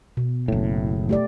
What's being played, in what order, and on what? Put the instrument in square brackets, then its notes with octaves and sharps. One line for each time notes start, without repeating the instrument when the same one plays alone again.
[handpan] B2
[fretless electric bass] F#1 A2
[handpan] A3 G4 D5